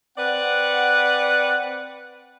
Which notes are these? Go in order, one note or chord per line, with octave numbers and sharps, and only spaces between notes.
C4 B4 D5 F#5